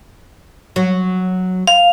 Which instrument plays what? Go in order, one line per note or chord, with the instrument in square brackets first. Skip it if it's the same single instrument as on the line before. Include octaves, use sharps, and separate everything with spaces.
[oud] F#3
[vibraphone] F5